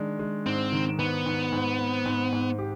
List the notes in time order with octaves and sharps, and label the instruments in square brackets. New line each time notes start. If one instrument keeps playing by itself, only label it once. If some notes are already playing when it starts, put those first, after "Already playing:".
Already playing: [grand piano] D#3 G#3 D4
G#3
[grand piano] G#2 [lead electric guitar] C4
[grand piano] D#3
[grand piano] G#2 [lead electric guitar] B3
[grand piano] G#2
G#2
C4
G#2
G#2
G4